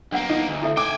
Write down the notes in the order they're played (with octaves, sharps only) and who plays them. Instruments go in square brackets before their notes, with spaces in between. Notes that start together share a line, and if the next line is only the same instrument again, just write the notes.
[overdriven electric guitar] B1 A#3 [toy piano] D4 F#5
[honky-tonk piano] D#4
[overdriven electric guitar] D2
[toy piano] E4 A4 E5
[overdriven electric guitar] G5 G#5 [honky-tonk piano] D6